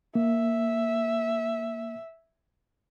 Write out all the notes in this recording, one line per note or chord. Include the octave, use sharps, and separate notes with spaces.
A#3 E5